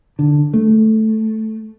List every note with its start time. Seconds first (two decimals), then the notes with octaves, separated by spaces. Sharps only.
0.19 D3
0.54 A3